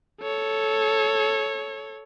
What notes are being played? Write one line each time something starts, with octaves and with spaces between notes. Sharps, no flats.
A4 C#5